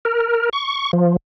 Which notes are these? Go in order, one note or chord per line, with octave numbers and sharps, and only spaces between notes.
A#4
C#6
F3